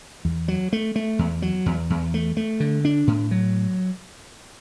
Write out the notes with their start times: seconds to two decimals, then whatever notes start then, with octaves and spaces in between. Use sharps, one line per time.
0.25 E2
0.48 F#3
0.73 A3
0.96 A3
1.19 E2
1.42 F#3
1.66 E2
1.90 E2
2.14 A3
2.37 A3
2.60 D3
2.85 D4
3.07 A2
3.31 F#3